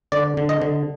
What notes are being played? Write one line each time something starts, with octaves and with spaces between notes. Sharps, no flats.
D3 D5
D3
D#5
D3